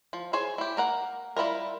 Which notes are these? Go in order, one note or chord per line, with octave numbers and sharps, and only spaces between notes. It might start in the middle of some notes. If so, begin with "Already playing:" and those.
F3
G#4 C5 C#5 G#5
E4 G4
A#3 A#4 F#5
G3 E4 F4 A#4